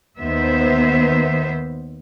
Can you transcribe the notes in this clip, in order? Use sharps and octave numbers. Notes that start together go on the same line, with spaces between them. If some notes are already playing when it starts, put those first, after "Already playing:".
D#2 D#3 B3 C5 E5